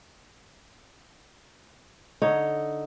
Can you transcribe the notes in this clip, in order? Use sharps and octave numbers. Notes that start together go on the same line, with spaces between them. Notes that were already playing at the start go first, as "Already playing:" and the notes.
D3 D#4 C#5